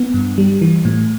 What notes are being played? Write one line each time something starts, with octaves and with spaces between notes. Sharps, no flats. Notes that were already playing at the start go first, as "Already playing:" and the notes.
Already playing: B3
G2
G3
E3
A2